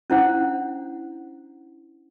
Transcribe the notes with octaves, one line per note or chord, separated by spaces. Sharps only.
C#4 D4 E4 C5 F#5